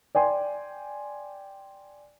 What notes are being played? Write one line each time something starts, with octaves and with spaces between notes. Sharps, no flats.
D5 G5 G#5 C6